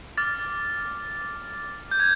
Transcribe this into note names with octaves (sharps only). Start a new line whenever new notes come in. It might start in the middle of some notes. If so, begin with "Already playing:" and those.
D6 F6 A6
G6
G#6